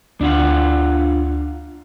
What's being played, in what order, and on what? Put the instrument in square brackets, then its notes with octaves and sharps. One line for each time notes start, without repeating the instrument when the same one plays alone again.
[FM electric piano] D2 [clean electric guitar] D4 F4 F#5